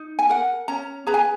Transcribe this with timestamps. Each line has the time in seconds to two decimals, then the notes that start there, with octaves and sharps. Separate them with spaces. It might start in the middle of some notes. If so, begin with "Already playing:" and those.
Already playing: D#4
0.19 G#5
0.29 A#4 F#5
0.68 C#4 A#5
1.07 G#4 B4 A#5
1.14 G#5